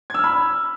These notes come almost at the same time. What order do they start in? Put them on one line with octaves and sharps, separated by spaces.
G#6 E6 F6 B5